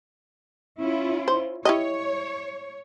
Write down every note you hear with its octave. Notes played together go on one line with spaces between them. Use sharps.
C#4 E4 F4
C5
E4 G4 C#5 D#5